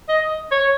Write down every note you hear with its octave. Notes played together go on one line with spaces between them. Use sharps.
D#5
C#5